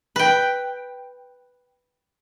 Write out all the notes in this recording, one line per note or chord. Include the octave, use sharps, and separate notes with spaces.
B4 G5